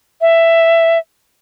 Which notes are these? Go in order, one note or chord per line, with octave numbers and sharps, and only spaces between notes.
E5